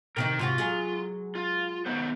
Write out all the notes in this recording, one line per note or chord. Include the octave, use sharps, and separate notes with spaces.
C3 D#3 D#4 A#4 G5
G#2 C3 F4 F#4
F#3 G#3 G#4
F4
D#3 B3 C5